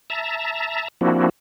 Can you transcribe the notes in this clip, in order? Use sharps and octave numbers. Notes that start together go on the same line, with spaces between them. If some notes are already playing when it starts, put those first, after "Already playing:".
E5 A5 A#5
F3 A#3 C4 D4 E4 F#4